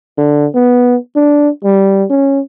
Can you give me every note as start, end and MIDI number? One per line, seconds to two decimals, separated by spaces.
0.18 0.47 50
0.55 0.96 59
1.16 1.49 62
1.64 2.04 55
2.10 2.40 61